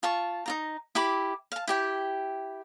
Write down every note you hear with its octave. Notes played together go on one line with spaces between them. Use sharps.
F4 A5 C#6
D#4 F4 A#5
E4 G4 B5 D6
F5 A5
E4 G4 G5